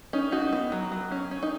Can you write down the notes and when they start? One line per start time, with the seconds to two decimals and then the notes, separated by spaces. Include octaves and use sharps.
0.13 C#4 D#4
0.32 D#4 F#4
0.53 B3
0.72 F#3
0.92 F#3
1.11 C#4
1.31 C#4
1.43 D#4